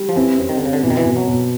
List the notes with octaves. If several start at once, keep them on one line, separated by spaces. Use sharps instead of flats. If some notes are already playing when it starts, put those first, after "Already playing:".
Already playing: G3
F3
E3 C4
C4
D#3
D3 C4
C#3
D3
B2 E3
D#3
E3
B2
F#3
B2